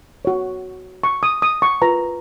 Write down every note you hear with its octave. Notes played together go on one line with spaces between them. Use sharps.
F#4 C#5
C#6
D#6
D#6
C#6
F4 B4 A#5